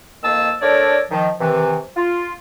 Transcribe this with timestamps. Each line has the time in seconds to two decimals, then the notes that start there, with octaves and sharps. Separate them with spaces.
0.23 F2 D#3 A#3 A5 E6
0.61 A3 D4 A4 A#4 C#5 D5
1.10 D#3 F3
1.40 C3 D#3 E3
1.97 F4